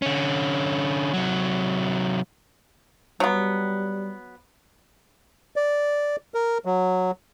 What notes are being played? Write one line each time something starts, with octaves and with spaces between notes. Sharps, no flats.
D3 C#4
C3 F#3
F#3 G3 B3
D5
A#4
F#3